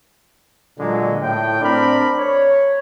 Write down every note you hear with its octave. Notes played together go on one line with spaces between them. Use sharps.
A#2 D3 F#3 G#3
A2 G5
C4 D4 A#4 B5
C#5